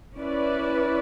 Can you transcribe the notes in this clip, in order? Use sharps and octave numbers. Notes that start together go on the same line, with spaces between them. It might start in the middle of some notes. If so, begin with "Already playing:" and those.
C#4 E4 B4 D5